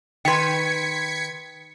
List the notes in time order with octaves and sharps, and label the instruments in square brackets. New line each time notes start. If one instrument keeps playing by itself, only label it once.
[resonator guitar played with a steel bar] D#3 B4 [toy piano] G5 C6 [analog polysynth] G#6 B6 C#7